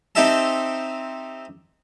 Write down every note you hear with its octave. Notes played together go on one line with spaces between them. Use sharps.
C4 D#4 G4 D#5 E5 A5